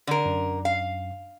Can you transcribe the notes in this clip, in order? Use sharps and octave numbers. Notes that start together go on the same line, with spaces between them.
D3 A#4
F#2
F5